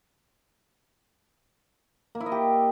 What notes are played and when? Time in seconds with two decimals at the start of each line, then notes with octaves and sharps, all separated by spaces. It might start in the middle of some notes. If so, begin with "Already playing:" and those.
2.15 A#3
2.20 E4
2.26 D#5
2.32 G4